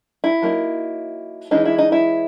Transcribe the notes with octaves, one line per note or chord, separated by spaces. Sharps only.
E4
F#3 A#3 D#4
E3 G#3 C#4 D#4
E4
D#4
E4